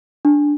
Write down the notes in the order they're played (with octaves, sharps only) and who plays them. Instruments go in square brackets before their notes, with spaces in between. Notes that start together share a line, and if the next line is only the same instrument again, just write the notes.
[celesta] D4